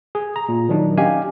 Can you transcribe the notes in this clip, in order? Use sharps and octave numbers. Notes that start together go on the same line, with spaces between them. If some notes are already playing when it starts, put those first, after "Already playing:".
G#4
A#5
A#2
D#3 F#3 D4 D#4
C#4 G4 D#5 F5 G#5